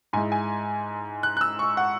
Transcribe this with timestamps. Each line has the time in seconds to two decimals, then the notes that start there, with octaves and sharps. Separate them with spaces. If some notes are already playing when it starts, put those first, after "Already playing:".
0.13 G#2 G#3 E4 G#5
0.32 G#5
1.23 F#6
1.37 F#6
1.41 E6
1.59 C#6
1.77 F#5